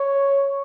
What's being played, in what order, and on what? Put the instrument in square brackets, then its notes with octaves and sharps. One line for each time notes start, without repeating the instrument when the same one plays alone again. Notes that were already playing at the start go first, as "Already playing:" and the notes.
Already playing: [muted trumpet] C#5